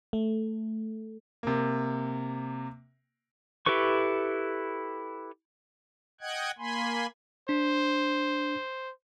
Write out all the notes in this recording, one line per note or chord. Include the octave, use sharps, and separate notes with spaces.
A3
C3 A#3
E4 G4 A4 B4 C#6
D#5 F#5 G5 F#6 G#6
A#3 G#5 B5 C6
D4 C5